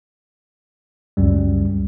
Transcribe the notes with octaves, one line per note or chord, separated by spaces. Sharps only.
C#2 F#2 G3